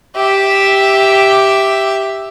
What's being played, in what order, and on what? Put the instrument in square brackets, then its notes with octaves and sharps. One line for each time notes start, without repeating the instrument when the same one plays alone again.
[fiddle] G4 E5